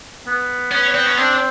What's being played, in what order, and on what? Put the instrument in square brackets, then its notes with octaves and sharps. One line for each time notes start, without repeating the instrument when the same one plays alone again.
[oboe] B3
[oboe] B3 [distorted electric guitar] C#4
[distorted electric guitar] C4
C#4
[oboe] C4 [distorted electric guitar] D4